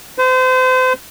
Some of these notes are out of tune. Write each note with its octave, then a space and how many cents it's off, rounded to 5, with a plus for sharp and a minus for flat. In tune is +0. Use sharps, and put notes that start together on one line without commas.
C5 -35